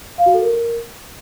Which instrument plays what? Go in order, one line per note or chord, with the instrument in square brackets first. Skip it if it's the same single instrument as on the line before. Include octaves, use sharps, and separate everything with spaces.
[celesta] F5
F#4
A4
A#4